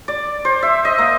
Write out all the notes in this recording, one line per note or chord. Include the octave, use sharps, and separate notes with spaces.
D5
C5
E5
D#5
A#3